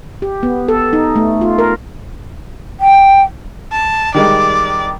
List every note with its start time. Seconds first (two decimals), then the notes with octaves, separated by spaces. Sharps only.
0.22 G4
0.43 B3
0.68 A4
0.93 D#4
1.16 A3
1.41 F4
1.58 A#4
2.80 G5
3.72 A5
4.14 D#3 G3 G#3 D5